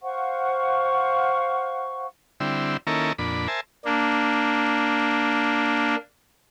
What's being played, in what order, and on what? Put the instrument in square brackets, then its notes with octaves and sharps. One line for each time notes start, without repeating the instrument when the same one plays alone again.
[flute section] C5 F5 F#5 C#6
[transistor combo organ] D3 G3 C4 E4
D#3 A#3 C#4 E4 A4 A#4
F2 A#2 D4 B5
A#4 C5 E5 G#5 A5
[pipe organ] A#3 D4